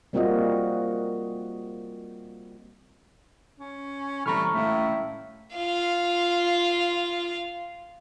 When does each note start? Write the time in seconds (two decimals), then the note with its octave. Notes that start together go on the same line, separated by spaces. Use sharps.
0.13 G3 A#3 C4 F4 F#4 D#5
3.60 C#4
4.26 E3 G3 A3 C4 A#5 B5 C#6 F6
4.54 A2 A3 C#4 E5 F5
5.56 F4 F5